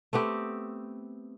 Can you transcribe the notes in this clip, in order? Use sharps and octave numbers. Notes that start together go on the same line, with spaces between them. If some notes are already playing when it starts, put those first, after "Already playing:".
A3 B3 C4 G4